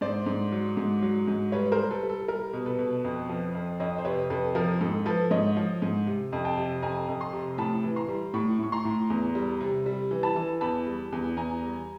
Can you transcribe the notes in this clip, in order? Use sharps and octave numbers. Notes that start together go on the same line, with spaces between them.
G#2 C5 D5
G#2
F#3
G#2
F#3
G#2
G3 B4 C#5
A#4 C5
G3
A4 B4
G3
A4
G3 A#4
B2
A4 B4
B2
F2
F3
F2
F2 C#5 D#5
C5
C3 B4 C#5
F2 A4 B4
F3 A#4
G#2 A4
F3 A4 B4
G#2 C#5 D#5
F3
G#2
C3
F2
G5 A5
C3
F2 G#5 A#5
F2
A#5 C6
C3
A2 A5 B5
E3
A#5 C6
G3
A2 B5 C#6
A2 C#6
A#5 C6
A2
E2
G3
C3
G3
E3
A5 B5
E3
E2 A5 B5
G3
E2
E2 G#5 A#5
G3